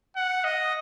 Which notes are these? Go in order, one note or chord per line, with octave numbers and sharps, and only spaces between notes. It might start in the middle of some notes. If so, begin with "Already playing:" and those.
F#5
D#5